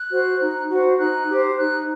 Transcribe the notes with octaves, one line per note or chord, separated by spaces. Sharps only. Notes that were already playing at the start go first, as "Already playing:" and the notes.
Already playing: F#6
F#4 C5
D#4
F#4 C5
D#4 F#6
G4 C5
D#4 F#6